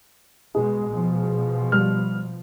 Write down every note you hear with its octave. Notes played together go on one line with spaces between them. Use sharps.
B2 G#3 G#4
B2 F3
G3 F6